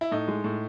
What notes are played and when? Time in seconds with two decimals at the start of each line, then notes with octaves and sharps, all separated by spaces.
0.01 E4
0.11 A2 D#4
0.28 G#3
0.44 A2